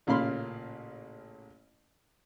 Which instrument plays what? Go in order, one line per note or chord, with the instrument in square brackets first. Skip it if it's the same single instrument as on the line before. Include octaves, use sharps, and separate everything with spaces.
[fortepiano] A1 A#2 C#3 F5 B5 C6